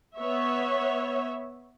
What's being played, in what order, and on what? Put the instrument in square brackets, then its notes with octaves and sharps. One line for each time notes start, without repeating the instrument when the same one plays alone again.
[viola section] B3 C#5 E5